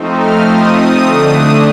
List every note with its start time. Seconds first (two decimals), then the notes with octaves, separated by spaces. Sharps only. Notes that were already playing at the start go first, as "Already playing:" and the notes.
Already playing: F3 A3 C4 D#4
0.16 F6
0.45 D#6
0.74 D#6
1.04 D3 A3 D4